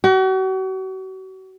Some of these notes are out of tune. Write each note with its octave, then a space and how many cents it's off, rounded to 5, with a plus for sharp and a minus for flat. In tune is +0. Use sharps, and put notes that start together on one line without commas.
F#4 +40